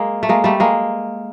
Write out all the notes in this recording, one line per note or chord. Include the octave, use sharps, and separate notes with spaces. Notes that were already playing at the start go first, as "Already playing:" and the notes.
Already playing: G#3 A#3
A3
G#3 A#3
G3 A3
G#3 A#3